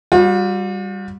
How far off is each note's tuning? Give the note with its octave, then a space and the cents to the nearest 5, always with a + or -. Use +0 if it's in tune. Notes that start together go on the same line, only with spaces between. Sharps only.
G3 +0 F#4 -45